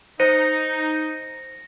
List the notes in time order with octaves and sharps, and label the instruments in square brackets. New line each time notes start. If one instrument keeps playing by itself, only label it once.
[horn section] D#4 [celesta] C5 [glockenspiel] A#6 C#7 D#7